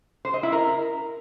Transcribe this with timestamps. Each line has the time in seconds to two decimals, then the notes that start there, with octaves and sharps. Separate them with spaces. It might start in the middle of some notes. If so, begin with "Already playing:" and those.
0.25 C5
0.34 D#5
0.43 E4
0.52 A#4